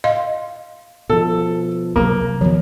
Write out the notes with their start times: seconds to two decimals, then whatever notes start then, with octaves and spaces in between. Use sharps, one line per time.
0.04 D#5 F5 C6
1.10 B2 F3 A4
1.96 C3 F#3 A#3
2.41 D#2 B2 F3